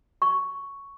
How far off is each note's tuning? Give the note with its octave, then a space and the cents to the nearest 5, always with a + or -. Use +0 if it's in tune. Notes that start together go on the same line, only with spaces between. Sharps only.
C#6 +5